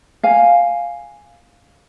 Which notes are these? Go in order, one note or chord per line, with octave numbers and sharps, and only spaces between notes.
F5 G#5